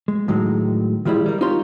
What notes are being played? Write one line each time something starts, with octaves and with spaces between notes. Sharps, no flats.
G#3
A2 D#3 F#3 G#3
D#3 F3 G3 G#3 E4
G3 A#4
D#4 F4 G4 C#5 C6